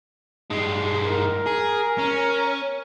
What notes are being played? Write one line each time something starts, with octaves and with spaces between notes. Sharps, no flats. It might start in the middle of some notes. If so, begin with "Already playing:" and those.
G2 G#3
A#4
G#4
C#4